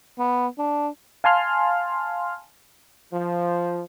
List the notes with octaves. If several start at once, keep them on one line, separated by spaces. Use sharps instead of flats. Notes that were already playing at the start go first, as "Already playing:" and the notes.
B3
D4
F5 G#5 A5 C6 F6
F3